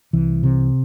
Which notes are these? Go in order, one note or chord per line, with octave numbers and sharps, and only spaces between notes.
C2 E3
C3